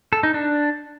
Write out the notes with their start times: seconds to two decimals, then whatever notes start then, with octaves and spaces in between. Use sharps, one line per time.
0.13 A4
0.23 D#4
0.34 D4